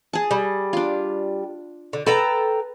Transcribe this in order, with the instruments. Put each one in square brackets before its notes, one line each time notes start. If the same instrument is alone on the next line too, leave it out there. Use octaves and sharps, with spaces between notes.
[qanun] G#4 A5
[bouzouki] G3
[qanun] D4 F4
[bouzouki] D3
[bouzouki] A4 G5 A#5 [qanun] B4